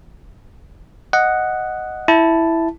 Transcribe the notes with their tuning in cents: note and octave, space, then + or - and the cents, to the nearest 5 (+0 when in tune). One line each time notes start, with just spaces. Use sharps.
D#5 +0 F#5 +0
E4 +0 A5 +0